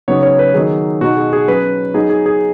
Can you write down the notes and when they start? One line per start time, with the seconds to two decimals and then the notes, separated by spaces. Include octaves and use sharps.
0.08 C#3 F#3 B3 D#4 C#5
0.23 C#5
0.39 B4
0.54 D#3 F#3 B3 D#4 G#4
1.01 B2 B3 D#4 F#4
1.17 G#4
1.33 G#4
1.48 F#3 C#4 B4
1.94 F#3 B3 D#4 G#4
2.10 G#4
2.26 G#4